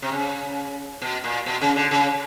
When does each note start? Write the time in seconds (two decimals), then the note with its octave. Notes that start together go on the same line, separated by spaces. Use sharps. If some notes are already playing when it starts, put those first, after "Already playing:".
0.02 C3
0.12 C#3
1.02 B2
1.24 A#2
1.46 B2
1.61 C#3
1.76 D3
1.91 C#3